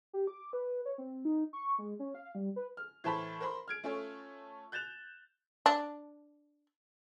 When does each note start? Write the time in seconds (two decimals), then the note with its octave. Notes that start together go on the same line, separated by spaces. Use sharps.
0.13 G4
0.27 D6
0.53 B4
0.85 C#5
0.98 C4
1.25 D#4
1.53 C#6
1.78 G#3
1.99 C#4
2.14 F5
2.35 G3
2.56 B4
2.77 F6
3.04 A2 E3 C5 A5 B5 B6
3.40 A#4 C5 B5 C6
3.68 F6 G#6 D7
3.84 A3 C#4 F4 A4 C#5
4.72 F#6 G6 A6 E7 F7
5.66 D4